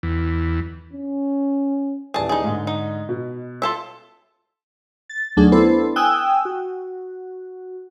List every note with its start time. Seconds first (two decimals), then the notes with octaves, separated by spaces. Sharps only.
0.03 E2
0.93 C#4
2.14 D#1 E3 G#4 D5 A5
2.29 D#4 G#4
2.44 G#2 D3
2.67 D#4
3.09 B2
3.62 F4 A4 E5
5.10 A6
5.37 D#2 F#3 A3 D4 G#4
5.52 B3 D4 E4 A4 C5
5.96 G5 G#5 D#6 E6 F#6
6.45 F#4